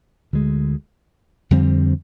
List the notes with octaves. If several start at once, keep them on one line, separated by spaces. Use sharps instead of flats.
D2 D3 G#3
F2 D3 G3 C4